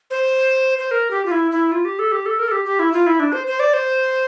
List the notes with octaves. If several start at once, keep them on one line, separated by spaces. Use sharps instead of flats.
C5
C5
A#4
G4
F4
E4
E4
F4
G4
A4
G4
A4
A#4
A4
G4
G4
E4
F4
E4
D4
C5
C5
D5
C5